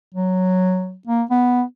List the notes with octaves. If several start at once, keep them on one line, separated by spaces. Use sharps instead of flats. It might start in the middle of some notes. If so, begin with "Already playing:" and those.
F#3
A#3
B3